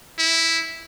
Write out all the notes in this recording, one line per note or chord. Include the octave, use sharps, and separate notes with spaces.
E4